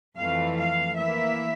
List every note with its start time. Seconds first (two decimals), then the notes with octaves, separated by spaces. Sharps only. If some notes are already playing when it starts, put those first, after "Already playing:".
0.17 F2 E3 A3 F5
0.57 F5
0.97 E3 A#3 E4 E5